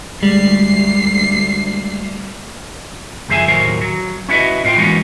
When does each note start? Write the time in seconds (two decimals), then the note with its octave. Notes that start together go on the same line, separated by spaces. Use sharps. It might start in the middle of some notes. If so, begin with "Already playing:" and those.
0.23 D2 G3 G#3 C7
3.28 C#2 F#2 F3 G#4 E5 G#5
3.48 D#2 A2 F#3 A#4 C5
3.81 F#3
4.29 C#4 E4 F#4 B4 D#5
4.65 A2 F4 F5 G5 C6
4.78 E3 G#3 A#3 B3 C#4 F#4